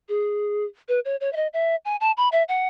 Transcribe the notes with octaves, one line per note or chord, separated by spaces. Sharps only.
G#4
B4
C#5
C#5
E5
D#5
E5
G#5
A5
B5
E5
F#5